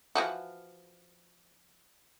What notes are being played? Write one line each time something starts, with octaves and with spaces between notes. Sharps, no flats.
E3 F3 F#4